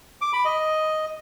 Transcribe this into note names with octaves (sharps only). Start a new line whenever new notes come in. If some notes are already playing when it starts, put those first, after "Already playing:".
D6
B5
D#5